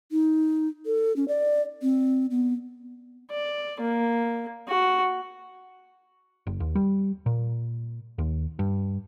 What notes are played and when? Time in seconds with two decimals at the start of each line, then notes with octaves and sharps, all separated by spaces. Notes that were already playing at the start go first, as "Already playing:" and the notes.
0.12 D#4
0.86 A4
1.16 C#4
1.28 D5
1.82 C4
2.31 B3
3.30 D5
3.81 A#3
4.68 F#4
6.47 F#1
6.60 D#2
6.75 G3
7.26 A#2
8.18 D#2
8.59 G2